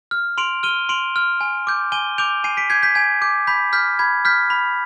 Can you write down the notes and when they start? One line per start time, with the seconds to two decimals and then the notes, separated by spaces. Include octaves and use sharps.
0.11 F6
0.38 C6 D7 F7
0.63 F6 D#7 G7
0.89 C6 D7 F7
1.16 F6
1.41 G#5
1.67 D6 G6
1.92 G#5 D#7 G7
2.18 D6 G6 D7 F7
2.44 G#5 C7 D#7
2.57 B6 D7
2.70 D6 G6 G#6 C7
2.83 G6 B6
2.95 G#5 G#6
3.22 D6 G6
3.47 B5 G6 B6
3.73 F6 G6 B6
3.99 B5 G#6
4.25 F6 G6 B6
4.50 B5